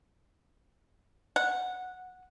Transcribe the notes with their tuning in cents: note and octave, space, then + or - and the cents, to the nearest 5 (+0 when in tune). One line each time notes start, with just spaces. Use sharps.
F#5 -10